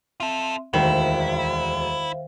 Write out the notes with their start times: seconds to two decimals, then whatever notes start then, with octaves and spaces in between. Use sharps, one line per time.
0.20 C4 F4 A4 E5
0.73 E1 D2 D#3 E4 C5 E5 F5